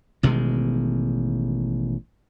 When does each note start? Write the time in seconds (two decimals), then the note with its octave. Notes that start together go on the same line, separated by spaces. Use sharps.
0.23 A1 B2 D#3 G#3